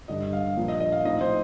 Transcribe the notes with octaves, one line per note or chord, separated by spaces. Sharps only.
G2 D3 G3 D#5
F5
A#2 F3 A#3 D4
D#5
D#5
F5
A2 F3 C4 D#4 D#5
C5